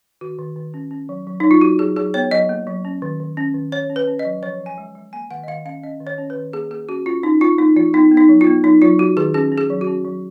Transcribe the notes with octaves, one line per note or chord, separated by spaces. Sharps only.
D#3 F#4
D#3
D#3
C#4
C#4
F#3
F#3
F#3 D#4
F4
F#3 F#4
F#3 G#4
F#3 G#4
B3 C#5
F#3 D#5
A#3
F#3
C#4
D#3
D#3
C#4
D#3
C#4 C#5
C#4
B4
C#4
D#5
F#3
F3 C#5
F3
G#5
G#3
G#3
A#3 G#5
D#3 F#5
D#5
D#3 F5
C#4 F5
C#4 D#5
D#3
C#5
C#4
B4
D#3
A#3 G#4
A#3 G#4
C#4 F#4
C#4 F4
C#4 D#4
A#3 F4
A#3 D#4
F3 F4
B3 D#4
B3
D#4
F#3
F4
B3
F#3 D#4
F#3 F4
F#3 F#4
D#3 G#4
C#4 G#4
C#4
G#4
F#3
F#4
C#4
F#3